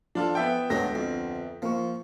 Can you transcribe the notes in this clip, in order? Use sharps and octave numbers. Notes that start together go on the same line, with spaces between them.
F3 D4 F4 A4
B3 E5 G5
D2 G#2 F#3 A3 B4 A#6
F2
F3 A#3 C#6